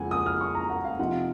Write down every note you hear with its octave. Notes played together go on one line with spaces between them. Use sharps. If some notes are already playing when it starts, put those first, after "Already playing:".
Already playing: F2 C#3 G#3 F#5 G#5
D#6
F6
C#6
A#5
F#5
F5
C3 F3 C4 D#4 F#5